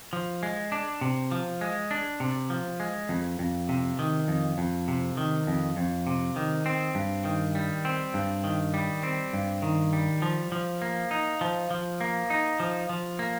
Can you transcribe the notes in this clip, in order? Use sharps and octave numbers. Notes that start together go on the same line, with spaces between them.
F3
G#3
D4
C3
F3
G#3
D4
C3
F3
G#3
F2
F2
C3
D#3
F2
F2
C3
D#3
F2
F2
C3
D#3
C4
G2
D#3
G3
C4
G2
D#3
G3
C4
G2
D#3
G3
F3
F3
A#3
D#4
F3
F3
A#3
D#4
F3
F3
A#3